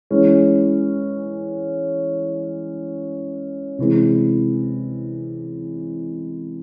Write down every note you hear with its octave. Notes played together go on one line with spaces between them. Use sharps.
E3 G#3 C#4
C3 E3 G#3